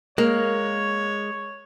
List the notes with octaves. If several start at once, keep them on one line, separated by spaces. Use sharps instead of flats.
G#3 A#3 C#5